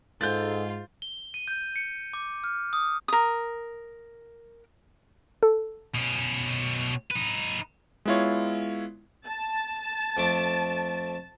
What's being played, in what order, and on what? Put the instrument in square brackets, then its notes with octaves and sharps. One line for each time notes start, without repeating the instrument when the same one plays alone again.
[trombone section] G#2 [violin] F4 [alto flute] A4 [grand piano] G6 A6
[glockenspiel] G7
D#7
G6
C#7
D6
F6
D#6
[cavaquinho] A#4 D#6
[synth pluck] A4
[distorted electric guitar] B2 C#4
D#4 B4
[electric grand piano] G#3 B3 E4 F4 C#5
[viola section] A5
[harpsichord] F2 A3 D6